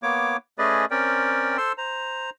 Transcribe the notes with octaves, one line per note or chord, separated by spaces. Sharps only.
A#3 B3 C#5 D6
A3 C#4 G#4 B4 D5 D#5
C4 C#4 A#4 D5 G5
A4 C5 C6 E6
C5 A#5